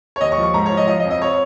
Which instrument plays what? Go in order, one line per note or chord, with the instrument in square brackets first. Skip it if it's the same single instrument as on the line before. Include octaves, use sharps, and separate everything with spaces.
[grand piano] C#5
D#2 D#5
C#6
F3
C#6
G#2 A#5
C#5
F3
D#5
F3 D#5
D#5
F2
D#5
C#5